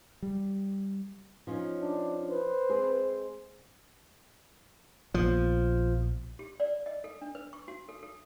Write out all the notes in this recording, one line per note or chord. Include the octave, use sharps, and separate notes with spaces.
G3
F3 C#4 D#4
D4
B4 C5
G#3 C4 G#4
A#1 F3 A#3 B3
G4
D5
D#5
A4
D4
B4
C#6
F#4
A4
A4